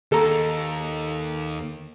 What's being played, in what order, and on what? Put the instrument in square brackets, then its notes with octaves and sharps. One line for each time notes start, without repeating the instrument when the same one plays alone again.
[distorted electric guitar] D#2 [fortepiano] A4 A#5